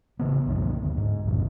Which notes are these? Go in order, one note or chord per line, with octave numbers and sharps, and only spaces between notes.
A1 C#3 B3
C2 F#2 D3 F3
D2
G#2
A#1 F2 B2